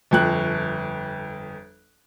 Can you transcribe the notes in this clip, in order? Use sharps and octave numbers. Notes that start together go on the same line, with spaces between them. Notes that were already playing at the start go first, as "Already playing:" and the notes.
G1 F2 F#6